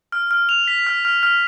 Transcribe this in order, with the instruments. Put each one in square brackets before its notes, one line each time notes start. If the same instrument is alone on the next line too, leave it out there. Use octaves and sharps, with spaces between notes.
[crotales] F6
F6
F7
B6
F6
F6
F6